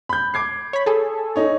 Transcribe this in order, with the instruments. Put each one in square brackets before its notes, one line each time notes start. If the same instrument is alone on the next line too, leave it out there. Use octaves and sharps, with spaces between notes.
[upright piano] B5 G6
D6 G#6 C7
[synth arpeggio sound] C#5 B5
G#4 A4
[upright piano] D#4 C#5